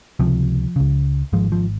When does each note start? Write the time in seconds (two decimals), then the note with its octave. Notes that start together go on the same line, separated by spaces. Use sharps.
0.20 C#2 C3 F3
0.76 C#2 C#3
1.33 G#1 G#2 F3 G#3
1.52 F3